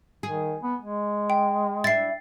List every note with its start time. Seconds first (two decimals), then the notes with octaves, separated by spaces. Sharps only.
0.23 D#3 G#4
0.62 B3
0.81 G#3
1.30 G5
1.84 D4 E4 A6 C7